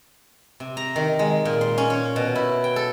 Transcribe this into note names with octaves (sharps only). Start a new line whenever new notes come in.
C3
A#5
D#3
G#3
A#2
C6
C#4
C#5
B2
E4
G5
A4